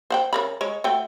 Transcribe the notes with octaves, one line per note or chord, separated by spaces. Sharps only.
C5 F#5 G5
C#3 A#4 B5
G#3 C#5
A3 F#4 G5